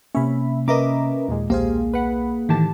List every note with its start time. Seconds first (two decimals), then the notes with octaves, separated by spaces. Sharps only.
0.15 C3 A#3 C#4 E5 B5
0.68 C#4 A#4 B4 D#5 E5 A#5 D6
1.28 D#2 A#2 G#3
1.50 B1 A#3 G4 G#4 C5 F5
1.94 B4 F#5 B5
2.49 A2 D#3 E3 G4 A5